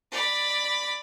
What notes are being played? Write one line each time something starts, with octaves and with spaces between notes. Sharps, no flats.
D5 B5